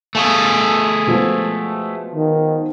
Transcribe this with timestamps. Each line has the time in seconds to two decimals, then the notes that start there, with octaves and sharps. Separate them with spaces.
0.15 A3 G#4 F5 G#5 C#6
1.07 B2 F3 G#3
2.15 D#3